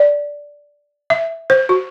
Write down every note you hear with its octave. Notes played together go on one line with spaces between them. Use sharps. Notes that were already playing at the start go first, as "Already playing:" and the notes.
Already playing: D5
E5
C5
F#4